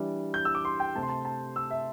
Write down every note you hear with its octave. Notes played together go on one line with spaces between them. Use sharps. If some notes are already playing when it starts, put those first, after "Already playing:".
Already playing: E3 G3 D4
G6
E6
D6
C6
G5
C3 A3 C4 A5
C6
A5
A5
E6
E5